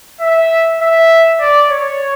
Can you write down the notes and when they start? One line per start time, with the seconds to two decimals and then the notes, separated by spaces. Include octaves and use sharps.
0.21 E5
0.81 E5
1.40 D5
1.71 C#5